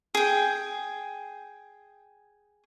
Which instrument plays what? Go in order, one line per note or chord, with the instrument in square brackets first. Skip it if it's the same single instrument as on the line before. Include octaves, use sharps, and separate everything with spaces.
[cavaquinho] G#4 G5